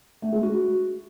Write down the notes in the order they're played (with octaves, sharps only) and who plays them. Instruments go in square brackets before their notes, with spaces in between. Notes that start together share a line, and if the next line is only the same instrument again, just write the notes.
[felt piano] A3
G#3
F#4